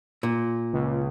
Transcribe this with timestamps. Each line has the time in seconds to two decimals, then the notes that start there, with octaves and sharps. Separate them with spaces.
0.23 A#2
0.73 C#2